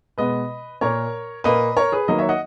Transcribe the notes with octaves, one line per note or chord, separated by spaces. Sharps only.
B2 G#3 B3 B4 D#5
A#2 A#3 A#4 C#5
A#2 A#3 B4 D#5
A#4 C#5
G#4 B4
D#3 F#3 A#3 B4 D#5
C#5 E5
D#5 F#5